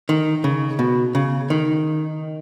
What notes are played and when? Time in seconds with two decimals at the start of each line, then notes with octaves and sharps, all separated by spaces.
0.09 D#3
0.44 C#3
0.79 B2
1.15 C#3
1.50 D#3